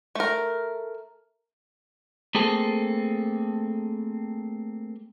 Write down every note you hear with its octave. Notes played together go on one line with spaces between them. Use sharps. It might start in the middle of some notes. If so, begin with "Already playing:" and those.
A3 A#4
A3 A#3 C4 G#4 A4